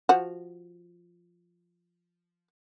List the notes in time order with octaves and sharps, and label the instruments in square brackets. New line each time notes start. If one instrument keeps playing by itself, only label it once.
[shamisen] F3 F#4